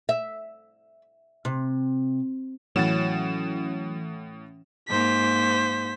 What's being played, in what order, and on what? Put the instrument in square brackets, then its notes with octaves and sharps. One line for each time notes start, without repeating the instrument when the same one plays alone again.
[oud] E5
C3
[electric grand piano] A2 F#5 A6 [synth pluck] E3 C#4 E7 [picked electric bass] F#3
[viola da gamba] G#2 A#3 [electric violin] C5 B6